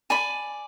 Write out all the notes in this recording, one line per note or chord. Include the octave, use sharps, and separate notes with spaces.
D5 G#5 B5